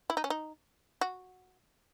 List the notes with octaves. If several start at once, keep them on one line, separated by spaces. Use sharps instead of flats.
E4
D#4
C#4
D#4
F#4